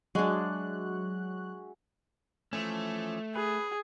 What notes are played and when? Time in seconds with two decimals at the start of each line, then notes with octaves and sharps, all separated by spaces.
0.15 F#3 G#3 D4 F#4 G#4 E5 F#6
2.53 E3 F3 A3 C#4
3.35 G#4 B4